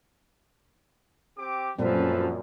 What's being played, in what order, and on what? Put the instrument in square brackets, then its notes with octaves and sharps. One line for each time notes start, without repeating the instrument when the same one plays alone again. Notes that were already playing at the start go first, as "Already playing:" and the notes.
[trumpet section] C4 G4 D6
[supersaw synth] F#2 [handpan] A#2 G3 C4 [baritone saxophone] F3 [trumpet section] C#4 A4 B4